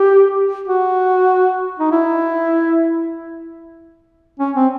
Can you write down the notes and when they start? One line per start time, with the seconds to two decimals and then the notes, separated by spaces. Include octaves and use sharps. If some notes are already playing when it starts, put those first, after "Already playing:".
Already playing: G4
0.68 F#4
1.79 D#4
1.92 E4
4.39 C#4
4.56 C4